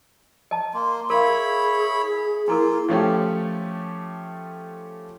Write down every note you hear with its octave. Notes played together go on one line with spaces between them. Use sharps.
D#5 A5
A#3 C6
E4 A#4 C#5 F5 B5
G#4
A#3 D4 E4 F4 A#4
F3 A3 C#4 G4